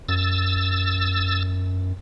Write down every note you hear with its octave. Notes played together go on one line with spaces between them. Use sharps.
F#2 E6 A6